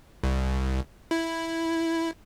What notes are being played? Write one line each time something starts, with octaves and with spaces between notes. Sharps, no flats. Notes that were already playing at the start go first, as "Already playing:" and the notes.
C2
E4